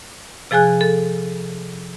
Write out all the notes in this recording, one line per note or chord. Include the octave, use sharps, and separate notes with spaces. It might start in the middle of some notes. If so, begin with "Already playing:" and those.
C3 F3 G#4 G#5 F#6
A4